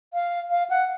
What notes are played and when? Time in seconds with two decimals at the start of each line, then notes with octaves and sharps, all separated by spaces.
0.14 F5
0.51 F5
0.70 F#5